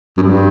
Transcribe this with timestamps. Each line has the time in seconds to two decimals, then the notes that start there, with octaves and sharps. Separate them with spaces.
0.17 F#2
0.22 G2